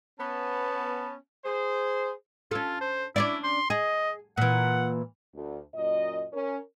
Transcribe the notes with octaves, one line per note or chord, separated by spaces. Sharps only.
B3 C#4 A5
G#4 C5
C#4 F4 A4
C5
C#4 D4 E4 D5
C6
G#4 D#5
A#2 E3 F#5
D2
F#2 A#2 D#5
C#4 A#4